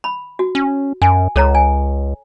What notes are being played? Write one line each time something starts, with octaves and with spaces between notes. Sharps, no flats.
B5
F#4
C#4
F#2 G#5
C#2 A4 C#5 A#5
G#5